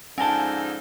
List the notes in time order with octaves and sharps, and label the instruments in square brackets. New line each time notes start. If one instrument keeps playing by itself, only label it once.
[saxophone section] G#2 D3 F3 [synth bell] C#4 A#6 G7 [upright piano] G#5 A5